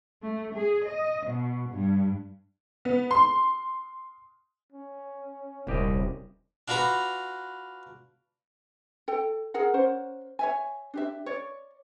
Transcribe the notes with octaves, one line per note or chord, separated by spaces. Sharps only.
A3
G#4
D#5
B2
G2
B3
C6
C#4
D#1 C2 G4 D#5
D4 F4 F#4 B4 A#5
A4 G5
G#4 A#4 F#5
C#4 A#4 C5 F#5
C#5 E5 G#5
D4 G4 E5
C#5 D5